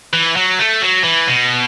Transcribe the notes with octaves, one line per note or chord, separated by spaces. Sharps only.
E3
F#3
A3
F#3
E3
B2